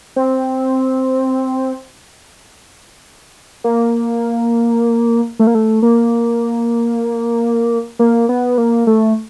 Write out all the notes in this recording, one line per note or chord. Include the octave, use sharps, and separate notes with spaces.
C4
A#3
A3
A#3
A3
A#3
A#3
B3
A#3
A3